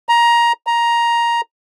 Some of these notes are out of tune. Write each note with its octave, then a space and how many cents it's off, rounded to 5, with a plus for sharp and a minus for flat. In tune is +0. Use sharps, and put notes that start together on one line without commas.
A#5 +15
A#5 +10